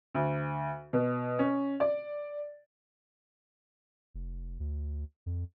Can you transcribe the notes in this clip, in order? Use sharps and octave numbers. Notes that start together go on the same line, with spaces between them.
D2
B2
C#4
D5
F1
D2
F2